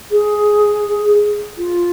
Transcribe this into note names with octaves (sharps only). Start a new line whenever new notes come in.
G#4
F4